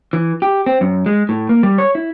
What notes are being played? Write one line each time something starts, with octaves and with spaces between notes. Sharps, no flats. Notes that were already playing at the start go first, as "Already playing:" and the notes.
E3
G4
C4
F#2
G#3
A2
A#3
G3
C#5
E4